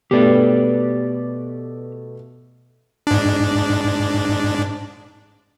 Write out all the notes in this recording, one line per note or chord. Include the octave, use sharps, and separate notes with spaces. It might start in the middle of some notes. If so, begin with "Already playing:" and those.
B2 A3 G4 B4 D5
G#2 D4